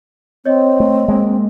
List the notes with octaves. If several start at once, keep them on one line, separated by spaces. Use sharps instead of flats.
C4 C#5 D#5
A3
G#3 A#3